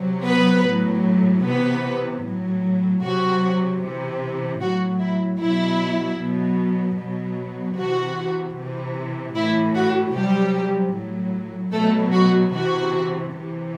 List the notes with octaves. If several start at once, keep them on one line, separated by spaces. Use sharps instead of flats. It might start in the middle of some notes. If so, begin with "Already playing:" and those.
Already playing: C3 F#3
B3 B4
A2 F#3
C3 E3 B3 B4
A2 F#3
C3 F#3 F#4
C3 E3
A2 F#3 F#4
E4
B2 F#3 E4
B2 F#3
B2 F#3
C3 E3 F#4
C3 E3
A2 E3 E4
F#4
C3 F#3 G3 G4
A2 F#3
B2 F#3 A3 A4
F#4
C3 E3 F#4
C3 E3